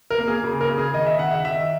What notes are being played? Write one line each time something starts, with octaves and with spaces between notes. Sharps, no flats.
A#4
A#3
G#4
C#3
A#4
C#3
G#4
D#3 D#5
E5
D#3 F#5
E5
D#3 E5